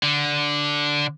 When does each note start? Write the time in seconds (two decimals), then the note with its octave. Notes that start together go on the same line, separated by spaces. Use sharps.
0.03 D3